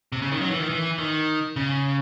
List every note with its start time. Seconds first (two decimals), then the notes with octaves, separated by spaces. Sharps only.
0.12 C3
0.22 C#3
0.32 D#3
0.41 F#3
0.51 E3
0.60 D#3
0.70 E3
0.98 D#3
1.56 C#3